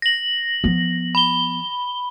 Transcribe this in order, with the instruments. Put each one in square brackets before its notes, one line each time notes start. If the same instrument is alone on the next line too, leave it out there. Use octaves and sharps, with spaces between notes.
[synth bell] A#6 F#7
[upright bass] F3 B3
[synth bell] B5 G7